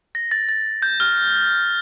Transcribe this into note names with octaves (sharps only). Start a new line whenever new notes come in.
A#6
A6
A6
G6
F6